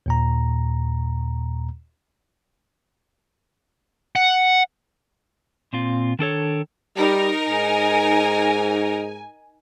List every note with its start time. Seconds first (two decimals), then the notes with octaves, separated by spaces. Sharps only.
0.06 D#2 A#2 A#5
4.16 F#5
5.73 A#2 C4 F4
6.19 D#3 D4 A4 C#5
6.97 G3 D#4 A#4
7.50 G#2 G#5